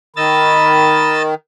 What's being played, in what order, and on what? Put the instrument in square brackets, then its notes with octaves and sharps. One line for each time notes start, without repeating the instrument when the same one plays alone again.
[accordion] D#3 [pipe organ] D#5 E6 A6 [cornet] B5